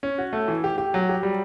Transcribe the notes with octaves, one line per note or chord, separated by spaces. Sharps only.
C#4
F#4
A3
E3
G4
G4
F#3
G4
G3